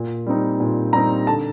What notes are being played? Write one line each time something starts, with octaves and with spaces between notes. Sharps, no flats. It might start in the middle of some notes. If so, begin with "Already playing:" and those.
Already playing: A#2
G3 C4 D#4
A#2
G3 C4 D#4 A#5
D3 A5